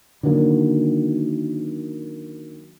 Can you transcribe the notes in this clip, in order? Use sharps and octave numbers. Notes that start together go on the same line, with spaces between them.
D3 D#3 F#3 A#3